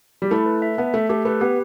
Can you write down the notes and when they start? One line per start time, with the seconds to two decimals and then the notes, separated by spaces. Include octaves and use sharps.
0.22 G3
0.31 A3 E4
0.46 B4
0.62 E5
0.78 B3 A5
0.94 A3 E5
1.09 A3 G4
1.25 A3 B4
1.41 B3 G4